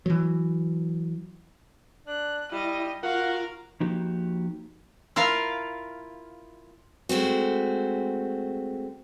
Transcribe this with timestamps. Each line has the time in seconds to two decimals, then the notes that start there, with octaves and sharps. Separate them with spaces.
0.06 E3 F#3
2.07 D4 F#6
2.52 G3 E4 D#5
3.03 F4 F#4 A#4 F5 F#5
3.80 F3 A#3 D#4 F#4 G4
5.16 E4 F4 A#4 F5
7.09 G#3 A3 C4 F#4